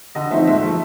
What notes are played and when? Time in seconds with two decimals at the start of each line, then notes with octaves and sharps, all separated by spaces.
0.15 D3 D#5
0.31 F3 A3 C4 D#4 E5
0.47 G#2 E5
0.63 F3 A3